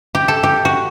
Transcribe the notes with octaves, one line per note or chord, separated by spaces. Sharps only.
G4
A4
G4
F#4